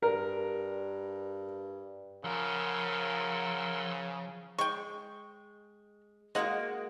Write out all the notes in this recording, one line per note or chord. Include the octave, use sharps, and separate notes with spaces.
G2 A#4
C#3 F3 A#4 F#5 C6 E6
G#3 G5 C#6
G#3 A#3 F#4 D#5 F#5